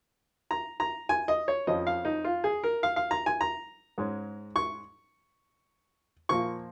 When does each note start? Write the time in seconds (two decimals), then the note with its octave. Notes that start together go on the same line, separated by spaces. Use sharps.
0.51 A#5
0.80 A#5
1.09 G#5
1.28 D#5
1.48 C#5
1.67 F2 F3 C#4 D#5
1.87 F5
2.05 D#4
2.24 F4
2.44 G#4
2.64 A#4
2.83 F5
2.96 F5
3.11 A#5
3.26 G#5
3.41 A#5
3.98 G#2 G#3 C#4
4.56 C#6
6.29 A#2 F3 A#3 C#6